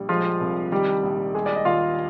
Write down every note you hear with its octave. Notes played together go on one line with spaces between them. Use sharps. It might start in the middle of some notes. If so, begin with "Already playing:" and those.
Already playing: A#1 G3
F3 G#3 F4
C2
D#3 G3 G4
A#1
G3 G#3 G#4
D5
D#5
D#2 F4 F5